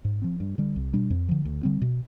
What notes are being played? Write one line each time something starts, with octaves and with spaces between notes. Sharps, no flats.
G#2
F3 C4
G2
D3 G3
C2
B2 G3 D4
F2
D3 F3
D2
D3 G3 C4
B2